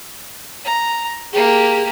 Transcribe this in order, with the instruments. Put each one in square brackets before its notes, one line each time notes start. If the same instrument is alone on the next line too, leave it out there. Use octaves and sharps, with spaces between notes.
[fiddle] A#5
[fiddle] A#3 G4 [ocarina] G#4